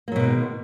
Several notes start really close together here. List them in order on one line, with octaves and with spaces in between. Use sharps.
A#3 F#3 B2 G#3 D#3